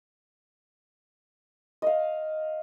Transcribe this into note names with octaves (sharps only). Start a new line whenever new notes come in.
D#5 F5